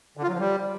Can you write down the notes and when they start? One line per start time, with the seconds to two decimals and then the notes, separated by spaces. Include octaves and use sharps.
0.17 D3
0.23 F4
0.28 F#3
0.34 F3
0.39 G3